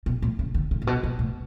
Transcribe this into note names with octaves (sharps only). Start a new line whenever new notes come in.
B2
A2
C#3
D3
C#3
A2
B2
B2
A2